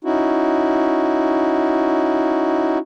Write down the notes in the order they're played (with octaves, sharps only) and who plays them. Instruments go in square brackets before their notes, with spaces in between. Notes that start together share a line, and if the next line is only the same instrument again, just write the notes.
[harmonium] C#4 D#4 E4 F#4